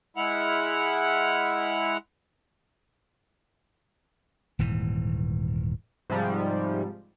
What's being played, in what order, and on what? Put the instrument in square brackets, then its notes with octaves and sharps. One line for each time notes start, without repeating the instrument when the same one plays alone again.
[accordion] G#3 E4 F#5 F6
[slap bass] D#1 G#2 E3
[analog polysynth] G#2 C3 F3 G3